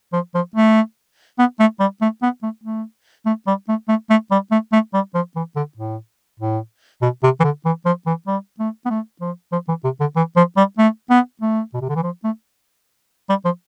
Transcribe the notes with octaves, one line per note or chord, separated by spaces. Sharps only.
F3
F3
A3
B3
A3
G3
A3
B3
A3
A3
A3
G3
A3
A3
A3
G3
A3
A3
G3
F3
E3
D3
A2
A2
B2
C3
E3
D3
E3
F3
E3
G3
A3
B3
A3
F3
F3
E3
C3
D3
E3
F3
G3
A3
B3
A3
B2
C3
D3
E3
F3
A3
G3
F3